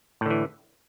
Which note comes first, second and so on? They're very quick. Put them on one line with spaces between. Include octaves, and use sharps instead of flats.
A2 D3 E3